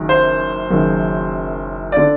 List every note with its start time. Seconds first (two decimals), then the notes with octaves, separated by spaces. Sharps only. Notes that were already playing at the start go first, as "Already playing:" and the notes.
Already playing: F#1 F#2 D#3
0.09 C5
0.70 F#1 F#2 D#3
1.92 D3 D5